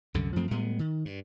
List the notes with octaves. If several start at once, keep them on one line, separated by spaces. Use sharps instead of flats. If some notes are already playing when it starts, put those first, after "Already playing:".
C2 F#2 D3
F#2 F3 A3 C4
A2 G3 G#3 B3
D#3
G2